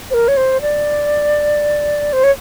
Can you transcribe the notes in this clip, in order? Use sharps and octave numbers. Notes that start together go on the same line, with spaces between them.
C5
A#4
C#5
C5
D5
C5
C#5